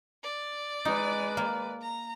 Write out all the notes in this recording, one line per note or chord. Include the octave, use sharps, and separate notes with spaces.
D5
G#3 D#4 B4
A#3
A#5